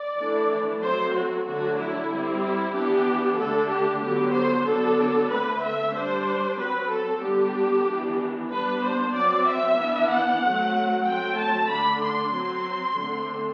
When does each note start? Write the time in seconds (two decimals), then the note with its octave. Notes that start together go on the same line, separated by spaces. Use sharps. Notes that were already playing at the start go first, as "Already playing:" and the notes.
Already playing: D5
0.18 E3 A3 D4
0.81 F#3 A3 C4 C5
1.14 F#4
1.45 D3 F#3 A3 D4 F#4
1.78 E4
2.09 G3 C4
2.42 E4
2.74 E3 B3 D4 G4
3.38 D3 A3 D4 A4
3.70 G4
4.02 D3 F#3 B3 G4
4.34 C5
4.65 D3 F#3 B3 D4 A4
5.30 D3 A3 C4 B4
5.62 E5
5.94 G3 D4 C5
6.57 F#3 C4 B4
6.89 A4
7.22 D3 G3 B3 D4 G4
7.86 E3 B3 D4
8.50 G3 B3 D4 B4
8.82 C5
9.14 F#3 C4 D5
9.46 E5
9.78 E3 B3 D4
10.10 F#5
10.42 F#3 A3 C4
11.06 F#3 A3 C4 G5
11.38 A5
11.70 D3 A3 D4 B5
12.02 C6
12.33 F#3 C4 C6
12.98 D3 A3 C4